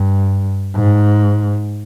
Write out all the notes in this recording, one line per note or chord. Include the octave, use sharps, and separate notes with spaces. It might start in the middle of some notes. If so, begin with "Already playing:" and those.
Already playing: G2
G#2